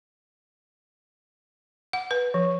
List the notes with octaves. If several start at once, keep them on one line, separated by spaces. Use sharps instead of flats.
F#5
B4
F3